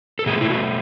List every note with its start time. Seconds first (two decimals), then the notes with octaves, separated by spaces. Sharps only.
0.19 A4
0.26 B2 A3 G#4
0.41 E4
0.50 F#4